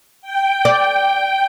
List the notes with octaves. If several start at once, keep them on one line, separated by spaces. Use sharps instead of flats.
G5
D5